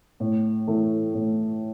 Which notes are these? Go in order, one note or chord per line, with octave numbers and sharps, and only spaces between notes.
A2
E3 A3
A2